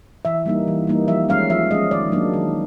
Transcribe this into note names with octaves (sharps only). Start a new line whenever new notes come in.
E3 E5
G3 A#3 D#4
E3
G3 A#3 D#4
F3 E5
G#3 C#4 F5
F3 E5
G#3 C#4 D#5
D#3 D5
F#3 A#3 D4
D#3